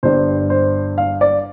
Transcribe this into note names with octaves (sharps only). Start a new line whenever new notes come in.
G1 G2 G3 C5
C5
F5
D5